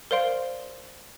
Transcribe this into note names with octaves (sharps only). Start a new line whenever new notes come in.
A#4 C5 D5 F5 C6 D7